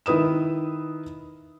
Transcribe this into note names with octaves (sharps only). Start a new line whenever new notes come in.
D#3 E4 B4 D#6 E7